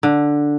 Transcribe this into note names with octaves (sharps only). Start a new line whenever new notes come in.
D3